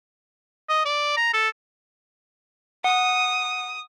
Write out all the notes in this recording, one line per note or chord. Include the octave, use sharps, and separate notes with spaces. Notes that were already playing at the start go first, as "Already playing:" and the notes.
D#5
D5
A#5
A4
F#5 D#6